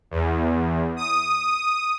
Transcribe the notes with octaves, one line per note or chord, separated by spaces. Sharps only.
E2
D#6